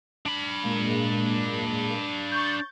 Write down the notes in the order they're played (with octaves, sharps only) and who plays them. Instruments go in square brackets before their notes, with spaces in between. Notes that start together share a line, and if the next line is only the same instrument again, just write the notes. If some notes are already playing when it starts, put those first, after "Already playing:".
[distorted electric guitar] D4 B5
[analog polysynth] A#2 G#3 A#3
C#6 G6 A6